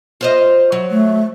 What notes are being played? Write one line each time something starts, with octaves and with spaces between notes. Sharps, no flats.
F4 C5 D#5
F#3
A3